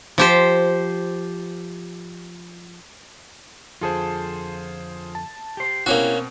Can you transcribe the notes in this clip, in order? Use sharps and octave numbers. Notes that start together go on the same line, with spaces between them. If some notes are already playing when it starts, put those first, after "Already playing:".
F3 G4 C5
F2 D3 F4 G#4 A4 C5
A5
G4 C5
B2 A#3 C4 C#4 E4 F#4 G4